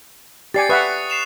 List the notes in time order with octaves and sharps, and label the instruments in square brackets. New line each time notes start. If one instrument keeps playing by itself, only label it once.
[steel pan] G4 D5 G#5 [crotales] A6 C7 C#7
[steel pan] B4 E5 F#5 [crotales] C#6 D#6 F#6
[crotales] C7 E7 F7